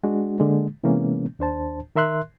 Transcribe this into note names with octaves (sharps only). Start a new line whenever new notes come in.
G#3 D4 F#4
D3 G#3 A#3
C3 E3 G#3 A#3 B3 C#4
D#2 D4 C5 A5
D#3 A#4 E5 C6 F#6